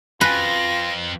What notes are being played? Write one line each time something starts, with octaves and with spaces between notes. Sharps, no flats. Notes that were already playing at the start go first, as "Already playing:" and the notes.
F2 F4 B4 A#6